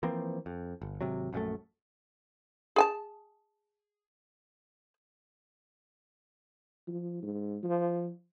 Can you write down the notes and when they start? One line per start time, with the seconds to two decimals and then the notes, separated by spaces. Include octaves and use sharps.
0.03 E3 F3 A#3 C4
0.46 F2
0.82 G1
1.01 G#1 C3 F#3
1.33 A#1 F#2 C3 A3
2.76 G#4 G#5 A5
6.88 F3
7.22 G#2
7.63 F3